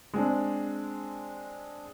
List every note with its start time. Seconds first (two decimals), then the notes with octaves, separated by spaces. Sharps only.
0.14 G#3 C4 D4